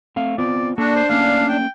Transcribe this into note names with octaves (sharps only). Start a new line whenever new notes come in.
A3 C4 F5
B3 C4 F4 D5
A#3 D4 F#4 A4
C5
A3 A#3 C#4 F5
G5